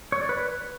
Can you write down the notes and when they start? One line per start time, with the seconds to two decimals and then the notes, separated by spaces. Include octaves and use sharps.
0.12 C#5
0.21 D5
0.29 B4